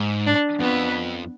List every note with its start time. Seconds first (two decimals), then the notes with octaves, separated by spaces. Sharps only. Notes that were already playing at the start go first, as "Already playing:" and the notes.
Already playing: G#2
0.26 D4
0.60 F2 B3